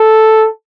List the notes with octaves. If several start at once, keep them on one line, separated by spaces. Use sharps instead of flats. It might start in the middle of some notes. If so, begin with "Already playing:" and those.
Already playing: A4